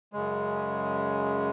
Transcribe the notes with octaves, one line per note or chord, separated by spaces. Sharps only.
F#2 C#3 G#3